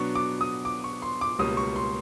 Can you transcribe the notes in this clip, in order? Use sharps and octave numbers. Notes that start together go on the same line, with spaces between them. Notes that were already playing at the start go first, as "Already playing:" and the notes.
Already playing: B2 F#3 B3 D4 C#6
D6
D#6
D6
C#6
C6
D6
C#2 B2 G3 A#3 C#4 D#6
C#6
C6